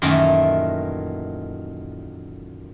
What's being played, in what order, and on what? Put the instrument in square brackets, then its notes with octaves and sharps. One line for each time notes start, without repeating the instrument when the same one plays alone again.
[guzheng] F#2 A#2 D#3 E3 A3